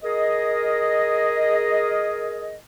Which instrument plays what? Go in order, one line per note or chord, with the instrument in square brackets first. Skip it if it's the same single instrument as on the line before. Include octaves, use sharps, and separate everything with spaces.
[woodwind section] G#4 A#4 D#5